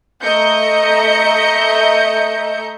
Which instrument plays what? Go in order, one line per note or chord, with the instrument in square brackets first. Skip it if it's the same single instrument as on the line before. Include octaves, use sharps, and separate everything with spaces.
[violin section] A3 D#5 E5 A#5 G6 C#7